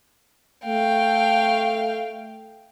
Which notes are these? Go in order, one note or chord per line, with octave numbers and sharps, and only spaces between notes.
A3 F5 G5